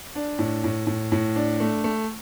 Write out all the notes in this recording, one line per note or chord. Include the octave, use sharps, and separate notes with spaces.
D4
A2
A2
A2
A2
D4
A3
A3